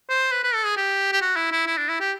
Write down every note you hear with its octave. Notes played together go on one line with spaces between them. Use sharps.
C5
B4
B4
A4
G#4
G4
G4
F#4
E4
E4
E4
D4
E4
G4